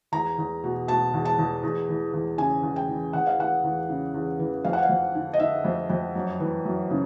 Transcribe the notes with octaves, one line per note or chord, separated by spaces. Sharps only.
E2 A#5
E2
B2
B2 A5
E2
A5
E2
E2
E3
E2
C#3 G#5
E2
G5
E3
E2 F#5
F5
E3 F#5
E2
C#3
E2
E3
F2 F5
F#5
F5
F2
D3
D#5
D3 E5
F2
F2
F#2
E3
F#2
C#3